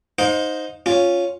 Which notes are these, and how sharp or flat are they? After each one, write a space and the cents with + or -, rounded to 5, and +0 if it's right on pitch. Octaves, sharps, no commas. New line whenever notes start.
D#4 +0 C5 +0 F5 +40
C#4 +0 F4 +5